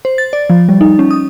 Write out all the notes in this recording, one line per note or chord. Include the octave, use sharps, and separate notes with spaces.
C5
A6
D5
F3
G3
D#4
C#4
D#6